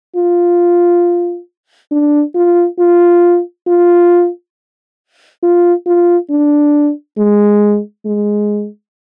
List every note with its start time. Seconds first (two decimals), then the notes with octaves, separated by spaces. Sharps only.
0.16 F4
1.92 D4
2.35 F4
2.79 F4
3.67 F4
5.43 F4
5.86 F4
6.30 D4
7.18 G#3
8.06 G#3